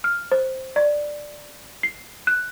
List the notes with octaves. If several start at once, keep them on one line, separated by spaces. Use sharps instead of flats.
F6
C5
D5
C7
F#6